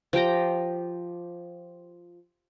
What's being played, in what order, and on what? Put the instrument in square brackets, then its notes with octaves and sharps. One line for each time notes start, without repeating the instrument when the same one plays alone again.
[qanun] F3 G4 G5 A#5